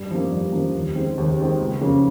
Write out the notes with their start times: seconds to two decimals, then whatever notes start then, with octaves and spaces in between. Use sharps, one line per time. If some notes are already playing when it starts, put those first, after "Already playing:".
Already playing: G2
0.11 F3 A#3
0.32 G2
0.52 F3 A#3
0.74 D#2
0.95 D#3 G#3 C4
1.18 D#2
1.38 D#3 G#3 C4
1.61 C#2
1.81 C#3 F3 A#3